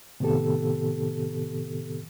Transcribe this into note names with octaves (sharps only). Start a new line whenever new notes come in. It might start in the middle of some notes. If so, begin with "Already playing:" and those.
A2 C3 D#3 B3 G4 A4